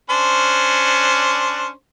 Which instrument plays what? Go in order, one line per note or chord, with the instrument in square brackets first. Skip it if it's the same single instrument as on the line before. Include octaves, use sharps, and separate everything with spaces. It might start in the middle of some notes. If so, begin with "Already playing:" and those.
[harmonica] C#4 D4 C5